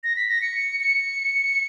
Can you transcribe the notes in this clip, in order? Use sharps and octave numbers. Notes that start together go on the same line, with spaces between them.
A#6
B6
A#6
C#7
C#7